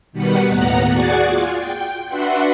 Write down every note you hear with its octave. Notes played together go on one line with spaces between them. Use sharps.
B2 D#3 G3 B4 F#5 C#7
D#2 A2 B3 F#5 A#5
F#4 G#4 D5 F#5 G#6 A6
F4 G#5
G5
D4 F#4 B4 E5 F#5 C6